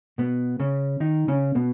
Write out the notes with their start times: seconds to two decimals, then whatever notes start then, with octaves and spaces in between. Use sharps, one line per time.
0.18 B2 B3
0.60 C#3 C#4
1.00 D#3 D#4
1.28 C#3 C#4
1.55 B2 B3